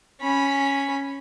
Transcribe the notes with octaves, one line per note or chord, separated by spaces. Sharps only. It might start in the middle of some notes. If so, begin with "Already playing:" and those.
C#4 B5